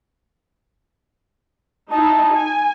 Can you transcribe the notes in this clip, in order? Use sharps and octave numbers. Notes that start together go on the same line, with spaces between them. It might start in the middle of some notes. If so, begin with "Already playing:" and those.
D#4 E4 A5
G#5